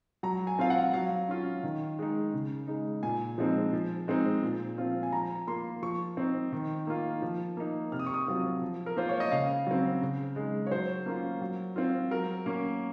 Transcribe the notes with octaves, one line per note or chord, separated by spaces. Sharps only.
F#3 A#5
G#5
C4 F4 F5
F#5
F#3 F5
C#4 F4
D#3
G#3 D#4
C#3
G#3 D#4
A#2 G#5
F3 G#3 C4 D#4
F3
G#3 C4 D#4
A#2
F3 C4 F4
G#5
F3 A#5
A#3 F4 C6
F3 C#6
C4 D#4
D#3
A#3 F4
F3
A#3 D#4
C3 F6
D#6
C#6
D#6
F#3 C4 F4
F3
A#4
A#3 F4 C5
C#5
D#5
C#3 F5
F#3 C4
C#3
G#3 D#4
C#5
F#3 C5
A#3 C#4 F4
F#3
C4 F4
F#3 A#4
A#3 C#4